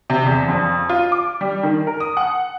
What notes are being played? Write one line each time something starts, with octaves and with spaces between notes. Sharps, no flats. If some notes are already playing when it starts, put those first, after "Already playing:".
C3
E2
F2
F4
D6
G3
D#3
A#4
D#6
F#5